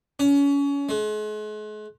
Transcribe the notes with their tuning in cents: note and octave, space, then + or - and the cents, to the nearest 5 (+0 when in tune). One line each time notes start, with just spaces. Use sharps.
C#4 +30
G#3 +40